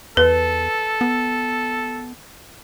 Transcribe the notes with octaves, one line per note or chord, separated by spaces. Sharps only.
E2 A4 B4
B3